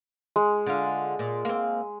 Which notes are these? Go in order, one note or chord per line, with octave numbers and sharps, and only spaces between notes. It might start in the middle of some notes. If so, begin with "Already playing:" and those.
G#3
D3 F4
A#2
A#3 C4